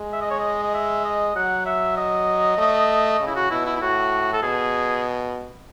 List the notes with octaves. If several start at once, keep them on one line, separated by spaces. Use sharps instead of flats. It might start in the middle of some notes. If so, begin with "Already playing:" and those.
Already playing: G#3
E5
D#5
C#5
D#5
D#5
E5
D#5
F#3 F#5
E5
D#5
A3
C#3
E4
F#4
B2 E4
E4
E4
A2 F#4
A4
B2 G#4